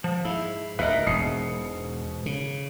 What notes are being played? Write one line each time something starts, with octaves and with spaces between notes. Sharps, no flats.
F3
G#2 E4
D2 A2 A#4 B4 D#5 E5
E1 G#2 B2 D#6 C7 C#7
C#3